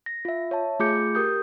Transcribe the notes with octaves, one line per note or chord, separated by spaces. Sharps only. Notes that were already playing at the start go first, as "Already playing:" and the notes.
A#6
F4 E5
C#5 E5 A5
A3 F4 G#4 D6 G6 C#7
G4 A#4 D#6 G6